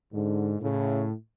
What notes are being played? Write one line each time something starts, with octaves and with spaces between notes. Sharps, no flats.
G#2 D3
A2 C#3